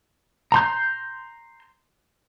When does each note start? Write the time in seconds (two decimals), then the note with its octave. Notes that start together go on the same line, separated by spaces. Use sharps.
0.52 A#5 C6 G6